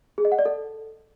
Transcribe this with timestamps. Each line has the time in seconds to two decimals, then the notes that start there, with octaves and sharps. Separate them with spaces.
0.18 G#4
0.25 D#5
0.32 F#5
0.39 D5
0.45 A4